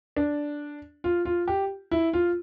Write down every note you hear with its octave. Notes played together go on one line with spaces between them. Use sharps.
D4
F4
F4
G4
E4
F4